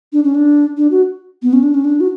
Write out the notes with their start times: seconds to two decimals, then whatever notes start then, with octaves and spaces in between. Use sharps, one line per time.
0.13 D4
0.24 C#4
0.35 D4
0.77 D4
0.91 F#4
1.42 B3
1.53 C#4
1.63 D4
1.74 C#4
1.84 D4
2.00 F#4